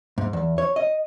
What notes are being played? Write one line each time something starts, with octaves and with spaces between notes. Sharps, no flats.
G#2
E2
C#5
D#5